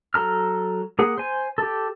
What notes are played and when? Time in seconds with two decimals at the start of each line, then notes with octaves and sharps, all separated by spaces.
0.14 F#3 A4 A#5 F6
0.99 A#3 G#4 F#5
1.18 C5 G#5
1.58 G4 A4